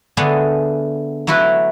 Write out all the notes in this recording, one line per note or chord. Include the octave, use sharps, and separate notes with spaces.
D3 A3 B3 D4 G#4
F#3 A3 E4 F#4 B4